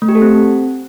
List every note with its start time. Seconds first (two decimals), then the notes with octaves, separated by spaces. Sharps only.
0.02 A3
0.09 G4
0.15 A4
0.22 C4